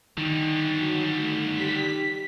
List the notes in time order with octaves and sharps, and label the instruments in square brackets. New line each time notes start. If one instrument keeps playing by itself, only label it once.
[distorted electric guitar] D3 G3 [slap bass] D#3
[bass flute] F#3
A3
[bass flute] G4 [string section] B6